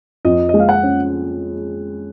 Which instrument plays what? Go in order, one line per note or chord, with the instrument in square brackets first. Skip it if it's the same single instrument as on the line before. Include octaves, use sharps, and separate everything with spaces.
[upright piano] F2 [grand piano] D#5
[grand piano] D#5
[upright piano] G#3
[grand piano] F5
F#5
[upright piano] C#4